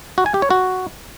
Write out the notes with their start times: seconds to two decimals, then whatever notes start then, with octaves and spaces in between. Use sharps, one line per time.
0.18 F#4
0.26 G#5
0.34 G4
0.42 C#5
0.50 F#4